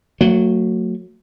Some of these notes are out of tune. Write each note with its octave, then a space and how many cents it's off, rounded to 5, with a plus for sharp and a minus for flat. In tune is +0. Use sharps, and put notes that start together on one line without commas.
F#3 -10 A3 +40